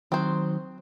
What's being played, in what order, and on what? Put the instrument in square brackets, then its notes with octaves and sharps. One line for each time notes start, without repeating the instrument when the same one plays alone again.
[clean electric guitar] D#3 F#3 [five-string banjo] C4 C5